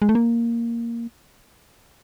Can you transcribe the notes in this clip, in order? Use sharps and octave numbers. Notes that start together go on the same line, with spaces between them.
G#3
A3
A#3